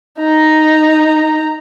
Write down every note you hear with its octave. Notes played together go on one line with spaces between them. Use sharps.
D#4 A#5